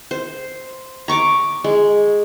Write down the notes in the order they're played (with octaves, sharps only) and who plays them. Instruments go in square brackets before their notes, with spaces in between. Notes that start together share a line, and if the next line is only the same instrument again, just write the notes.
[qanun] C5
A#5 C#6 D6
G#3